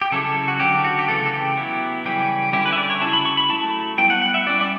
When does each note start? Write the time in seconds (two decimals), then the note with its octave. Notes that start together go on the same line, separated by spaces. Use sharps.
0.02 G4
0.12 C#3 F#3 C#4 E4 A4
0.24 A4
0.48 F#4
0.60 D3 F#3 C#4 G4
0.85 F#4
0.99 G4
1.08 C#3 E3 A3 A4
1.26 A4
1.33 G4
1.57 F#3 B3 E4
2.05 C#3 E3 G3 C#4 G4
2.53 D3 G3 C#4 E4 G4
2.66 B4
2.72 E5
2.78 D5
2.90 C#5
3.01 C#3 F#3 C#4 E4 A5
3.13 B5
3.25 C#6
3.37 B5
3.49 F#3 A3 E4 A5
3.98 G3 B3 E4 G5
4.10 F#5
4.22 F#5
4.34 E5
4.46 G3 C#4 E4 D5
4.61 D5